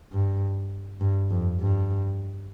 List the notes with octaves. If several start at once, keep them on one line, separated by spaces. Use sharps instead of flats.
G2
G2
F2
G2